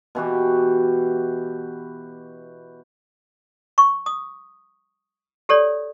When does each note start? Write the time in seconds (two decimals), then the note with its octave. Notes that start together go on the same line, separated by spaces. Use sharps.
0.15 B2 E3 F#4 G4
3.78 C#6
4.06 D#6
5.49 G4 A4 C#5 D5